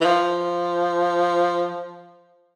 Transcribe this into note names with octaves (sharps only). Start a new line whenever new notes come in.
E3
F3